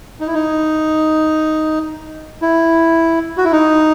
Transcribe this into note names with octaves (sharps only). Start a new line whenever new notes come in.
D#4
E4
D#4
E4
F#4
E4
D#4